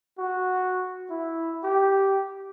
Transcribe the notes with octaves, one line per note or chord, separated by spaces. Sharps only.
F#4
E4
G4